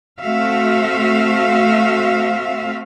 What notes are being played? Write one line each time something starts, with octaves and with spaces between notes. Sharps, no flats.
A3 C4 F#4 E5 F5